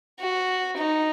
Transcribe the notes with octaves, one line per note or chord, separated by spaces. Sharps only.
F#4
D#4